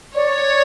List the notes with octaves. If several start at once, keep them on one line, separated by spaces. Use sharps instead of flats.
C#5 D5